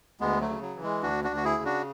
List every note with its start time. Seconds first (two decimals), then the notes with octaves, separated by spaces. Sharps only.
0.20 D2 G#3 B3
0.41 F#3 A3
0.49 C#3
0.62 F#3
0.76 E3
0.83 G#3
1.03 D2 D4 F#4
1.24 D4 F#4
1.30 D2
1.36 F#4
1.45 E4 G#4
1.58 C#3
1.65 D4 F#4